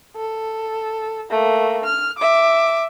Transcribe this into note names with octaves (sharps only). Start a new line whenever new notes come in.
A4
A3 A#3
F6
E5 D6